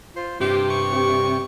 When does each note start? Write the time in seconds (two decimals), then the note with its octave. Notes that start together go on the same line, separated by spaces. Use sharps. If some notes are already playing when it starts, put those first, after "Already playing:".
0.16 F4 C5
0.41 G2 C3 G4 C5
0.70 C#6
0.92 G4